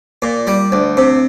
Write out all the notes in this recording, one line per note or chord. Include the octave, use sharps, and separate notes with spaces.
A#2
G3
D2
C3